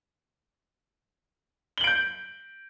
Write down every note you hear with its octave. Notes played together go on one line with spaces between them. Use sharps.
G6 D7 F#7 G7